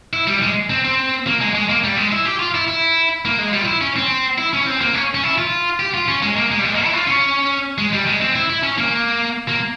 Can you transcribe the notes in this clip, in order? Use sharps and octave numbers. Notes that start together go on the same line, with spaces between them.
E4
G3
G#3
C4
C4
A#3
G#3
G#3
A#3
G3
G#3
E4
G4
F4
E4
E4
A#3
G#3
G3
F4
E4
C#4
C4
E4
C#4
C4
A#3
C#4
C#4
E4
F4
G4
F4
C#4
G#3
A#3
G#3
G3
G#3
A#3
E4
F4
C#4
G#3
G3
G#3
C4
E4
E4
C#4
A#3
A#3